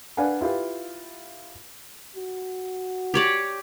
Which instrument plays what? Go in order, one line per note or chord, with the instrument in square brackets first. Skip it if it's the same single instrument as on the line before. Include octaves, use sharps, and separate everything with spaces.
[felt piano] D4 B4 D5 F5 F#5 G#5
E4 F4 G4 B4 F5
[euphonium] F#4
[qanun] G4 C#5 D5